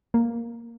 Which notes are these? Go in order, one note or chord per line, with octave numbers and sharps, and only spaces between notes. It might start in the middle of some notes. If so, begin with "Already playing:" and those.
A#3